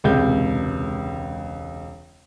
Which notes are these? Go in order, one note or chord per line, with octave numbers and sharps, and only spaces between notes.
E1 C#2 C3 G6